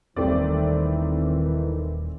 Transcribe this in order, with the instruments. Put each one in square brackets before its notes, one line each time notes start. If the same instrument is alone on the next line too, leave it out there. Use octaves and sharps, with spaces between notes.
[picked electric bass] D#1 D#2 G3 [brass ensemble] D#3 E3 [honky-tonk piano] A3 C4 D5